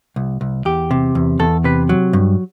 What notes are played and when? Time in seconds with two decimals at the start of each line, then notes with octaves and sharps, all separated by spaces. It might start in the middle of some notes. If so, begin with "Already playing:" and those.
0.16 C2
0.41 C2
0.65 E2 G4
0.91 C3
1.15 E2
1.39 E2 A4
1.64 C3 B4
1.89 F#3
2.13 G2